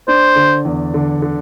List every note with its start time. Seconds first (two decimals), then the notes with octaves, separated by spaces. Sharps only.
0.08 D4 C5
0.36 D3
0.65 E2
0.94 D3
1.22 D3